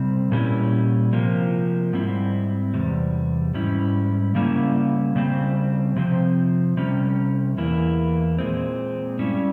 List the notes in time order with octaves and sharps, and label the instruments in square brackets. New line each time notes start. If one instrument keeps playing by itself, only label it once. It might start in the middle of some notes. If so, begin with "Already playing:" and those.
Already playing: [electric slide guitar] C3 G3 C4
A#2 G3 C#4 E4
C3 F3 A#3
G#2 G3 C4 E4
E2 C3 G3
G#2 G3 C#4 E4
C#3 G3 A#3 C#4 E4
C#3 G3 C4
C3 F3 C4
C3 G3 C#4
E2 E3 A#3 E4
A#2 G#3 C4
G2 G3 C#4 E4